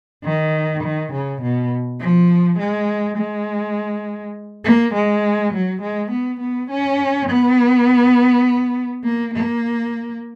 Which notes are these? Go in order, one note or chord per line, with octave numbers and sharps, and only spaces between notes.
D#3
D#3
C#3
B2
F3
G#3
G#3
A#3
G#3
F#3
G#3
B3
B3
C#4
B3
A#3
A#3